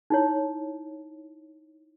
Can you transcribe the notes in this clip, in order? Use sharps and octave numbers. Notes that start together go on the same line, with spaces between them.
D#4 E4 C#5